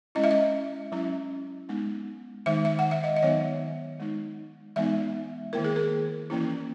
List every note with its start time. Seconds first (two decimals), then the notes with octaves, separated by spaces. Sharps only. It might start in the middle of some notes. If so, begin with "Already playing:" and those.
0.15 G#3 C#4 E4 D#5
0.24 E5
0.31 D#5
0.92 F#3 C#4 E4
1.69 G#3 B3 D#4
2.46 D#3 G#3 D#4 E5
2.65 E5
2.79 F#5
2.91 E5
3.04 D#5
3.17 D#5
3.22 D#3 F#3 B3 D#4 C#5
4.00 G#3 D#4
4.76 E3 G#3 B3 D#4 E5
5.53 D#3 A#3 E4 A#4
5.64 G#4
5.76 A#4
6.30 E3 A#3 C#4 E4